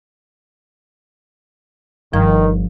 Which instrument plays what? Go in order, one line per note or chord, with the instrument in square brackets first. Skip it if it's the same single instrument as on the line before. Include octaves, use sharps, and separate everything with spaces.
[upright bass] G1 [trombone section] D#3 [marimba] F3